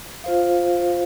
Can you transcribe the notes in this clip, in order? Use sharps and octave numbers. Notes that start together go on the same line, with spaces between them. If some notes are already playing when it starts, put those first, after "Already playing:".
F4 C5 F5